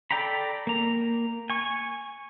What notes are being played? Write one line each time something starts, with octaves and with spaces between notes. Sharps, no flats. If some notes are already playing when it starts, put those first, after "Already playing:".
A4 D5 G5 A#5 B5
A#3 A#5
G#5 C#6